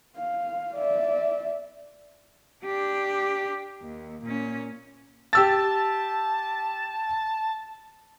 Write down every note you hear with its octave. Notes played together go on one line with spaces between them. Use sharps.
F5
D5 E5
D4 G4
D#2
A#2 C#4
G4 A5 E6 A6